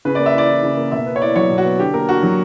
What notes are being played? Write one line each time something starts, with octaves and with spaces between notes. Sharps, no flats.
C#3 B4
A#3 D5
E5
E4 D5
E3
C#3
A#3
B2 E5
B3
C#5
E4 D5
F#3 C#5
B2
F#4
B3
D3 G4
A#3 A#4
D4 F#4
F#3